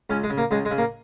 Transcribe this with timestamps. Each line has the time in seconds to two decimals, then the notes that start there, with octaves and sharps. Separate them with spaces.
0.10 C#2 C#4
0.23 G#3
0.30 C#3
0.37 A#3
0.51 C#2 G#3
0.65 G#3
0.71 C#3
0.78 A#3